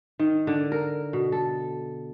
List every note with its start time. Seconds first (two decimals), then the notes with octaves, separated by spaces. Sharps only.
0.19 D#3
0.47 D3
0.72 A#4
1.13 B2
1.32 A4